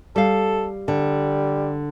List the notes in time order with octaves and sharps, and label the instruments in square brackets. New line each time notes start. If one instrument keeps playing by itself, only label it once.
[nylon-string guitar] G3 F5 [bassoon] A4
[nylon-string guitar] D3 [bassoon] G3